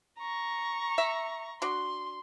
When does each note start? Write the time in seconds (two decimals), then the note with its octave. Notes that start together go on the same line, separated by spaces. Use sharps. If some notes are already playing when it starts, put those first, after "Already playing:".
0.19 A#5 C#6
0.98 E5
1.62 D4 F#4 C6